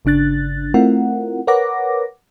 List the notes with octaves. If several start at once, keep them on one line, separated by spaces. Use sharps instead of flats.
G1 C#3 D4 F#6 A6
A3 C4 E4 F4 A#4 F#5
A#4 B4 C#5 F#5 D6 A#6